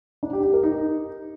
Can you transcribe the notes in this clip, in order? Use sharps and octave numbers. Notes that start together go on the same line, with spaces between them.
D4
G4
G4
A#4
D#4